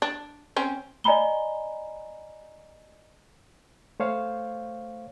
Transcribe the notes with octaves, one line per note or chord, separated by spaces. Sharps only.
D4
C4 C#4
D5 D#5 G#5 A#5 B5 G7
A3 C5 C#5 F5